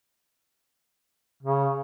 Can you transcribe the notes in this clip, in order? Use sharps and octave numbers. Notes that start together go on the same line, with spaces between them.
C#3